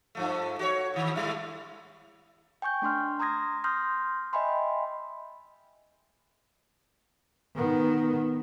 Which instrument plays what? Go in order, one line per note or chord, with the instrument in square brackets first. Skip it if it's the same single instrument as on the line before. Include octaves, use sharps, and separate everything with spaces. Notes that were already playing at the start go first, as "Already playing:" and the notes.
[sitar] G2 F3 A3
F#4 G4 C#5
A2 D#3
A2 G3 E4
[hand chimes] G5 G#5 C#6 G6
A3 D4 C6 F6
A#5 C6 D#6 G#6 A#6
C6 D#6 F6 G6 A#6
D#5 E5 G5 G#5 B5 C6
[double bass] D#3 B3